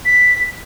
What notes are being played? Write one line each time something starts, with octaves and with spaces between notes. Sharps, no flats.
B6